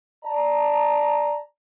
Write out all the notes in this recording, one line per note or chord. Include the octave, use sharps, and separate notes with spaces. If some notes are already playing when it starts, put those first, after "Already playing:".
D5 A5 A#5